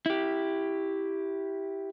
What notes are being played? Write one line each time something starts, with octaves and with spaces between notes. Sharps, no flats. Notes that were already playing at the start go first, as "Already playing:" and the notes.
E4 G4